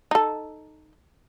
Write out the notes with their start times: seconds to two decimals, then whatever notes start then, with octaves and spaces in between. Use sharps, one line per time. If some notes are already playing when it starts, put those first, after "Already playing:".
0.11 D#4 A4